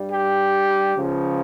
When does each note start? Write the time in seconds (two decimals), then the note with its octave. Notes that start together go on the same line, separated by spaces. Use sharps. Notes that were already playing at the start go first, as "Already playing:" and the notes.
Already playing: G2 G3
0.11 G4
0.95 C#2 C#3 F3